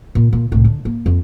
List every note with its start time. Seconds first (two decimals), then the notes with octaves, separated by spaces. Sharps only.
0.15 A#2
0.33 A#2
0.52 C2 A2
0.65 D3
0.85 A#3
1.06 F2